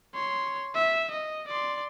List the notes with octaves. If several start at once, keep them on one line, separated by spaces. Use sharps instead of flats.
C#5 C6
E5
D#5
D5 C6